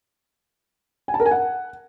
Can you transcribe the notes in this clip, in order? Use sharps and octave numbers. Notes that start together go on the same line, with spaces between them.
G#5
A5
A#4
G#5
F#5